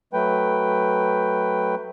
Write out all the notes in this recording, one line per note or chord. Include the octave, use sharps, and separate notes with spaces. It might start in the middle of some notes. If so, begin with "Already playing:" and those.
F#3 A3 B4 G5